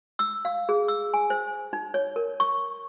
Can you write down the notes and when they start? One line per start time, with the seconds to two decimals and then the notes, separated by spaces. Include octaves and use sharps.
0.19 E6
0.45 F5
0.69 G#4
0.88 E6
1.14 G#5
1.30 C5
1.73 D#4
1.94 C#5
2.16 A#4
2.40 C#6